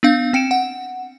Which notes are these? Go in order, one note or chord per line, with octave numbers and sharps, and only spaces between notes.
B3 D4 F5
C4 G5 C#7 D7 E7
F#5